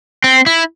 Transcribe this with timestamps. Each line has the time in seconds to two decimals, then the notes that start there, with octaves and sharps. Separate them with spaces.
0.24 C4
0.46 E4